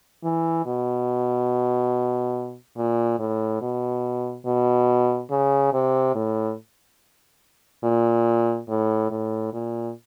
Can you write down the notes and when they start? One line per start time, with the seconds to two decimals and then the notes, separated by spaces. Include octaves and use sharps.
0.23 E3
0.66 B2
2.77 A#2
3.19 A2
3.62 B2
4.46 B2
5.31 C#3
5.73 C3
6.15 A2
7.84 A#2
8.69 A2
9.11 A2
9.53 A#2